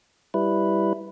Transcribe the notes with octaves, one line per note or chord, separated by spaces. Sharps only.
G3 E4 B4